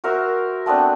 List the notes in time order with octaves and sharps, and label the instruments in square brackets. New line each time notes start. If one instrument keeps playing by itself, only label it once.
[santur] F#4 A#4 C5 E5
A3 B3 C4 D4